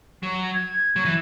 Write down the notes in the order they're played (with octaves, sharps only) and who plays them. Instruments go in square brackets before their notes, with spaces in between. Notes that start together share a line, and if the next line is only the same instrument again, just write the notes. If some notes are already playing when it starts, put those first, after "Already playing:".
[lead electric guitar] F#3
[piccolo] G#6
[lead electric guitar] F#3
E3